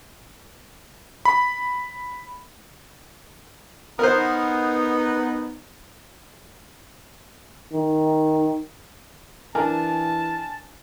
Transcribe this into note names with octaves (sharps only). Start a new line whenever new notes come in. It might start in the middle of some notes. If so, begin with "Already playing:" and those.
B5
B3 D#4 A#4 C5
D#3
E3 D4 A#4 G#5 A5